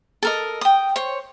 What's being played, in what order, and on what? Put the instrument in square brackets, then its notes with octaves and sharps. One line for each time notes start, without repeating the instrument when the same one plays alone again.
[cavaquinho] A4 A#4 D#5
G5 D#6
C5 C#5